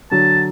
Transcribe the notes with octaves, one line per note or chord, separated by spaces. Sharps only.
D3 F#3 A5